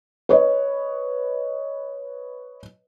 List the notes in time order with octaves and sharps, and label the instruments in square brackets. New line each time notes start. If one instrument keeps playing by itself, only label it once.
[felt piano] B4 C#5 D#5